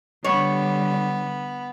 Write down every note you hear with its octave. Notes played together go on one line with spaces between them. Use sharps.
D3 G3 B3 C#5